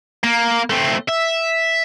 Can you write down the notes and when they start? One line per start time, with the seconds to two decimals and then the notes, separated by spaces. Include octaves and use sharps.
0.24 A#3
0.70 A3 C4
1.08 E5